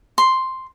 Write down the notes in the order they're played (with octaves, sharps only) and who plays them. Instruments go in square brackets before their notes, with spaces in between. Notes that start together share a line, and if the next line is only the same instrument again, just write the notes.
[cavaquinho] C6